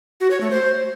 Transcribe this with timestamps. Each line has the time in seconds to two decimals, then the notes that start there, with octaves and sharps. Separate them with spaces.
0.21 F#4
0.31 C#5
0.41 A3
0.51 C5